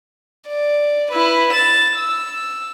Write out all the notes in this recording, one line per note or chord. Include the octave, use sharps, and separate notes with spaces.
D5
E4 B4
A6 E7
E6